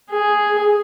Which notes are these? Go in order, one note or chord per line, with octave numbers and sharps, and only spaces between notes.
G#4